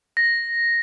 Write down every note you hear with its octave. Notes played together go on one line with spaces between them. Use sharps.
A#6